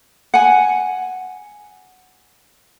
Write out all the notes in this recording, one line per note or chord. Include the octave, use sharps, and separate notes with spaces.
F#5 G#5